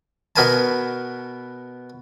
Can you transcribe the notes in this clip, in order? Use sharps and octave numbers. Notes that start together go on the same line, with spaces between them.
B2 B3 A#4 B4 G#5 A5